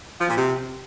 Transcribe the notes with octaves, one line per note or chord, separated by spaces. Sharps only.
F3
A#2
C3